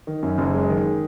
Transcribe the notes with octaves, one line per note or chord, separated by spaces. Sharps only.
D#3
F#2
F#1
G#3
D#3